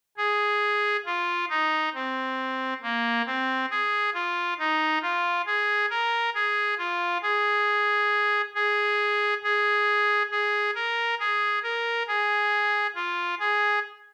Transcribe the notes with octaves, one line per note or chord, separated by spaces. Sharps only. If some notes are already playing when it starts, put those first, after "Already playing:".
G#4
F4
D#4
C4
A#3
C4
G#4
F4
D#4
F4
G#4
A#4
G#4
F4
G#4
G#4
G#4
G#4
A#4
G#4
A#4
G#4
F4
G#4